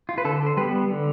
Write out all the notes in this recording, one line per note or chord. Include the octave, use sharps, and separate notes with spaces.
F4
B4
D3 A4
C5
G3 B3 B4
D3